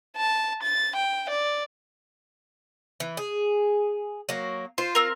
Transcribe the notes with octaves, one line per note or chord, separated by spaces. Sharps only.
A5
A6
G5
D5
E3
G#4
F#3 A#3
F4 C5
C4 A#4